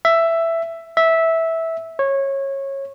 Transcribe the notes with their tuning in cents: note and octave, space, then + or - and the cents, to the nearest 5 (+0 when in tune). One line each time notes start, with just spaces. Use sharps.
E5 +10
E5 -10
C#5 -20